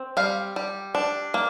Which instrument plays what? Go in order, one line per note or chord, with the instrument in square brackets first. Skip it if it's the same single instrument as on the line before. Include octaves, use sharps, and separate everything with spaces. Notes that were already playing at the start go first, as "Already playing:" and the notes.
Already playing: [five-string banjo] C4
G3 F5
G3
D4
A#3